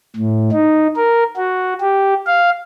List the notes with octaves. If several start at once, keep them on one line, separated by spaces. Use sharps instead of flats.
A2
D#4
A#4
F#4
G4
F5